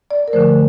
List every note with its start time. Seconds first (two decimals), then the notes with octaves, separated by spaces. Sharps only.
0.11 D5
0.28 A#4
0.33 D3 F3 A3 C5